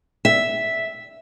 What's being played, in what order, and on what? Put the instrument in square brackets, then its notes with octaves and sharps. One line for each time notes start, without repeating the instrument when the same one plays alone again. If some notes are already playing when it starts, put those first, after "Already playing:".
[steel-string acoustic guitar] E5